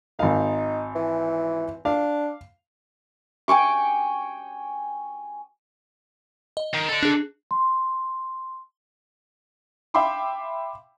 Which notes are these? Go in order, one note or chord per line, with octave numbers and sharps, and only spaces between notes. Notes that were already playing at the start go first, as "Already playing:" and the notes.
G#1 D#4 F5
E3
D4 F5
G5 G#5 C#6 D6
D#5
D#3
A4 D5
D4 G#4
C6
E5 F5 G5 B5 C6 D6